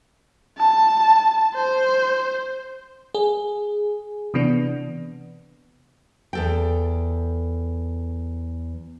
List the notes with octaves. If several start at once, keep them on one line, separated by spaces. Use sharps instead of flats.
A5
C5
G#4
C3 E3 B3 D4
E2 A4 G5